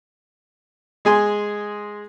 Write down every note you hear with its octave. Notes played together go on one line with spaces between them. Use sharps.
G#3 G#4 G#5 C6